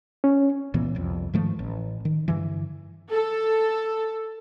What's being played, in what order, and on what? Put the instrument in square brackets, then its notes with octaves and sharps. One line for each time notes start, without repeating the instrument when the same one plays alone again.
[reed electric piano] C#4
[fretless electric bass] C#2 A#2 E3 B3
C2 F2
G#2 D#3 F3 A3
A1
D#3
G2 D3 E3
[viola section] A4